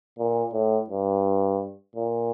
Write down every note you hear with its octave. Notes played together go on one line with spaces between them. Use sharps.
A#2
A2
G2
A#2